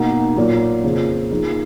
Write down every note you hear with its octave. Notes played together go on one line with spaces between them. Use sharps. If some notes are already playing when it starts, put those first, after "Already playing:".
Already playing: B2 A#3 D#4 F#4
A#2 F#3 A#3
F2 C#3 F3 A#3
F3 A#3 D#4 G#4